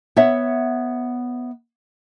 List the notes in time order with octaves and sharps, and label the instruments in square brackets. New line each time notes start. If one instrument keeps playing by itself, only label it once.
[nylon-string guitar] B3 C#5 E5 F#5